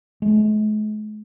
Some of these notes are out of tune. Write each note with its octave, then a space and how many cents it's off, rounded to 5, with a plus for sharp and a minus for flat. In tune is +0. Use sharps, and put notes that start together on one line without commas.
G#3 +45